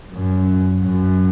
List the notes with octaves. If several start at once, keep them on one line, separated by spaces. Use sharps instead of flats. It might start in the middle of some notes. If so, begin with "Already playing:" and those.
F#2
F#2